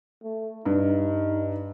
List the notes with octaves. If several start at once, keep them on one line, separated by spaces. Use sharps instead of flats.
A3
G2 D#4